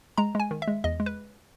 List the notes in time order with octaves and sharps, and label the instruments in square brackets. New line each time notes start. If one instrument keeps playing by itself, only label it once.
[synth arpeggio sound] G#3 A#5
G#3 G#5
D#3
E5
G#3
E2 D#5
G#3
B4